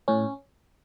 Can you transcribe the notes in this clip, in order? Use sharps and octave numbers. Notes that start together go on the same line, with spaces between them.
A2 C#4